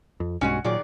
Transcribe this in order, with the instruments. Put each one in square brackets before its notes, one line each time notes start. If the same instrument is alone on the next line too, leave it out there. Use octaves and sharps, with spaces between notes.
[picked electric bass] F2
[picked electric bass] B1 G2 G#3 [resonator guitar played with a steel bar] C#4 F#4 G#5
[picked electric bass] A#2 F#3 [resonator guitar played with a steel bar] D#3 G#4 D5